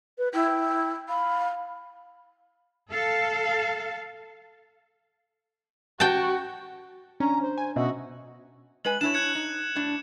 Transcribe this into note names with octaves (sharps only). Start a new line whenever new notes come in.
B4
E4 G5
F5 B5
A4 F5
F#4 G5 A5
C#4 D4 A#5
C5
G#5
B2 C#4 F#4 D#5 E5
G#3 B4 G#5 F#7
D4 E4 C#5 E7
F#6 G#6 C#7
D#4
A2 D4